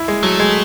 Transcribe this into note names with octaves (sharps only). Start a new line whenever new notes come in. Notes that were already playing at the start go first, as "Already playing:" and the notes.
Already playing: E4
G#3
F#3 A3
G#3